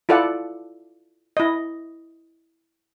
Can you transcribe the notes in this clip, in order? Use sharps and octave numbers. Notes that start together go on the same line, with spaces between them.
E4 F4 A4 D5 F#5
E4 D#5